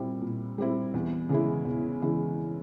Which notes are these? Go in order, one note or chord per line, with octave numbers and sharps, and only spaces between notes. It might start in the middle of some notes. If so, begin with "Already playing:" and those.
Already playing: A#2 G3 C4 E4
A#2
G3 C4 E4
E2
C#3 E3 G#3 E4
E2
C#3 E3 G#3 E4